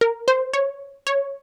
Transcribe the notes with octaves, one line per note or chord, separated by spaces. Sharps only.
A#4
C5
C#5
C#5